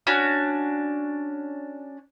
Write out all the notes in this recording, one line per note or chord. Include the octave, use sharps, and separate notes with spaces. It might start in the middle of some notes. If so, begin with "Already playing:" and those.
C#4 D4 F#4